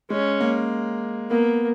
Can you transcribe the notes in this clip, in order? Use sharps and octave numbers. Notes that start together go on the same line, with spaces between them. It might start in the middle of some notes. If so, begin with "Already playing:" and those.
G#3 C#4
A#3
A#3 B3